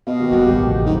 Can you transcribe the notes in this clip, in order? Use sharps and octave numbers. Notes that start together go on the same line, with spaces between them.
B2 F#4 D#5 F5
D#3 A#3 F#4 G4
F1 G3 F#5
A1 D#2 G4
C#3 F3 A3
D#3 F#3